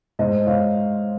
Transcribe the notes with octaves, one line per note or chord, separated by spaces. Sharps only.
G#2 C5 D#5
G#2 C#5 F5